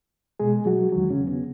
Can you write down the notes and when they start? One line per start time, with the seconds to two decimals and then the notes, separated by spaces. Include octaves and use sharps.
0.40 B2 G#3 G#4
0.66 F#3 F#4
0.92 E2 D#3 F#3 G#3 F#4
1.10 C#3 C#4
1.27 B3